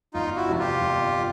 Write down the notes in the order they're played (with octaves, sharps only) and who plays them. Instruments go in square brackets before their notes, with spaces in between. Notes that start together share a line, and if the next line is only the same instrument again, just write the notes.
[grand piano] G1 [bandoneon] D#4 F4
[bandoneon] E4 F#4
[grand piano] F2 C3
[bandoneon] F4 G4
[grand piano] G1